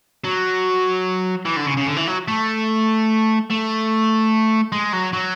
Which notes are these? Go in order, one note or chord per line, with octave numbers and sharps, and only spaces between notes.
F#3
E3
D3
C#3
C#3
D3
E3
F#3
A3
A3
G#3
F#3
F#3